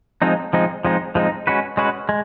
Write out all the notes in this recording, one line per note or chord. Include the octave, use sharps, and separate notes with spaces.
F3 G#3 C4 D#4
F3 G#3 C4 D#4
F3 G#3 C4 D#4
F3 G#3 C4 D#4
G#3 C#4 F#4 B4
G#3 C#4 F#4 B4
G#3